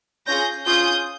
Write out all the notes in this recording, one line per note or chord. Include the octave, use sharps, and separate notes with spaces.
C#4 F4 G#4 G6 A#6
C#4 F4 G#4 D#6 G6